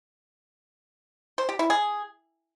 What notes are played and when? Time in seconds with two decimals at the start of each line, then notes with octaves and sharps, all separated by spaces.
1.38 C5
1.49 G4
1.59 E4
1.70 G#4